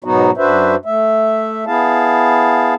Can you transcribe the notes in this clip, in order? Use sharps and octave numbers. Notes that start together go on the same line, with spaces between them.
G#2 B2 F#3 B3 D#4 F#4
F#2 D4 F#4 B4 C5 E5
A3 E5
B3 E4 G#4 F5 A5